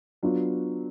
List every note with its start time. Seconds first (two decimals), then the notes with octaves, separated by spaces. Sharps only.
0.23 F#3 B3 D4 F4